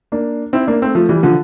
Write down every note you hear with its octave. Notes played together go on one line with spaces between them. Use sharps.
A#3 D4
C4 E4
A#3 D4
A3 C4
F3 A3
E3 G3
D3 F3